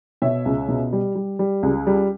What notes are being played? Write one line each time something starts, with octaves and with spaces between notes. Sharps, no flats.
B2 C#5 E5
C#2
B2
G3
G3
G3
C#2
G3